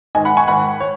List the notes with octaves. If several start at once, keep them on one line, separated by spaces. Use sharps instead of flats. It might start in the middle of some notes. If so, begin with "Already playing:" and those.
G#2 D#3 D#5 G#5
F#5 B5
G#5 C#6
G#2 D#3 F#5 B5
C#5